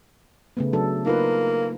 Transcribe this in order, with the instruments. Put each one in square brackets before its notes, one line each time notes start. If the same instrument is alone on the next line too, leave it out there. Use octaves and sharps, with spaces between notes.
[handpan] C#3 A3 B3
F#3 D4 A4
[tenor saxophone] A#3 [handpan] D#4 F4 B4